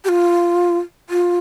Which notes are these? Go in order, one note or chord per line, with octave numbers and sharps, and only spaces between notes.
G4
F4
F4